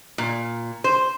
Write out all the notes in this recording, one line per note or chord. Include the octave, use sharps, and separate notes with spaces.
A#2
C5